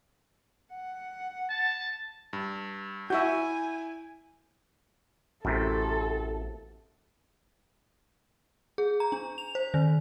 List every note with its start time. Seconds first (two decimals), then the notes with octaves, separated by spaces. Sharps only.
0.74 F#5
1.49 A5
2.33 G2
3.10 E4 F#4 E5 G#5 G6
5.45 A1 F#2 A2 C3 A4
8.78 G#4
9.00 A#5
9.12 D4
9.38 F7
9.55 C5
9.74 D#3